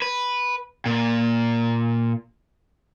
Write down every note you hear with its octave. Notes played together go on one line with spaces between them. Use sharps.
B4
A#2